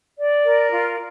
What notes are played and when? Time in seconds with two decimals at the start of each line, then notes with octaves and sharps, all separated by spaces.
0.17 D5
0.45 A#4
0.71 F4